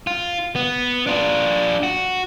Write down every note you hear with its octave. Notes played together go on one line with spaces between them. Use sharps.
F4
B3
D4 F4
F#4